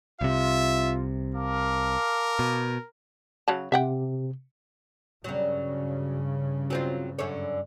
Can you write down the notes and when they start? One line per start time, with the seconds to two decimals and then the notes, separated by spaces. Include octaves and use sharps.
0.21 C2 C3 F4 E5
1.35 A#4 F5 A5 D6
2.39 B2
3.48 C#3 F#3 A5
3.72 C3 E5 F#5 G5
5.24 G2 C#3 F#3 G3
6.70 F#3 C4 F4
7.19 F#2 D3 C#5